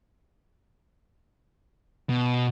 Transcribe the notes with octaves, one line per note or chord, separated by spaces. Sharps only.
B2